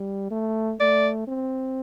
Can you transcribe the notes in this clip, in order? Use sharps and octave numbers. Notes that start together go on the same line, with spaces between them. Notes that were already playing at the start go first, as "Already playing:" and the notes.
Already playing: G3
A3
A3 D5
C4